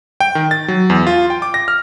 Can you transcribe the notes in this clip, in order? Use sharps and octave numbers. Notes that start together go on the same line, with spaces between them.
G5
D#3
A6
F#3
E2
F4
G5
D6
A#6
F6